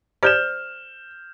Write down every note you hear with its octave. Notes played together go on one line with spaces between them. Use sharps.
G4 C5 D5 F6 G6 E7